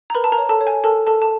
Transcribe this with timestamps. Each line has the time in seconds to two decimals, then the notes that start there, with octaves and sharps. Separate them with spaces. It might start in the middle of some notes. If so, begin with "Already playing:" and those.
0.10 A#5
0.14 A#4 B4 B5
0.24 A5
0.32 A#4 A#5
0.38 C#5
0.49 A4 A5
0.61 C#5
0.67 G#5
0.84 A4 A#4 A5
1.07 A4 A#4 A5
1.22 A5